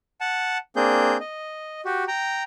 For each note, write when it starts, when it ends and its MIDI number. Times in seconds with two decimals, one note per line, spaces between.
0.21 0.58 78
0.21 0.58 81
0.76 1.17 58
0.76 1.17 60
0.76 1.17 62
0.76 1.17 68
0.76 1.17 91
1.20 1.81 75
1.85 2.04 66
1.85 2.04 67
2.08 2.43 79
2.08 2.43 82